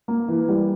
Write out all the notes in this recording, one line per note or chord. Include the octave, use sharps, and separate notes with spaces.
A#3
E3
G3